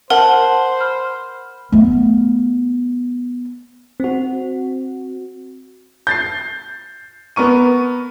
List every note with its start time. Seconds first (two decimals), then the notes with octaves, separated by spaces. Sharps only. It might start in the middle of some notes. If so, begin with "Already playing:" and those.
0.10 A#4 C5 F#5 A5
0.80 B5 F6
1.72 A3 B3
4.00 C4 F#4
6.07 G6 A6 C7
7.36 B3 A#4 C#6 D#7